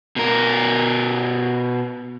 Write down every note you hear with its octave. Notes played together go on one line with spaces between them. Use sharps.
B2 A#4